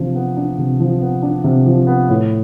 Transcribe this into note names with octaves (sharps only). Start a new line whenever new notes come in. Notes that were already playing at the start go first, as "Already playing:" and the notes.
Already playing: C3 F3 D4
B3
D4
C3
F3
B3
D4
C3
F3
B3
A2